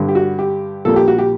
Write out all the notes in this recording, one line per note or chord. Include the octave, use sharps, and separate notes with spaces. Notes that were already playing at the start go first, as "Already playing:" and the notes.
Already playing: G2 D3 G3
G4
F#4
G4
A#1 A#2 G3 A#3 A4
G4
F#4
G4